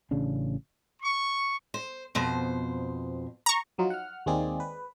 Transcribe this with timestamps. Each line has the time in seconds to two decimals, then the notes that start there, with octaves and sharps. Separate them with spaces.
0.11 A1 C#3 D4
1.02 C#6
1.74 C5
2.15 F2 B2 C5
3.46 A#5 C#6
3.78 F3 F#3 D#4 F4
3.90 F#5 F6
4.26 D#2 G#3 A#3 C4 G#4 D5
4.60 B4